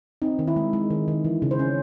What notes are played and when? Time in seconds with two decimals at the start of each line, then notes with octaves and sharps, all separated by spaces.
0.22 C4 D#4
0.39 D#3
0.48 E4
0.56 G#3
0.73 G#3
0.90 D#3
1.08 D#3
1.24 E3
1.42 C#3
1.51 C5
1.59 C#4